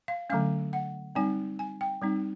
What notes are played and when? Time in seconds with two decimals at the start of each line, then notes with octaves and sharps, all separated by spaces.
0.08 F5
0.30 D3 F#3 A3 C#4 F5
0.73 F#5
1.15 G3 C4 D#4 G#5
1.59 G#5
1.81 G5
2.02 G3 C4 D#4